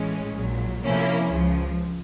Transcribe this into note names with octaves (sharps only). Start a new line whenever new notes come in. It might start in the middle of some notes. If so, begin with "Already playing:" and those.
Already playing: A1 A2 E3 G#3 C#4
A#1 A#2 F#3
C3 F3 A#3 C#4 E4
C#2 C#3 F3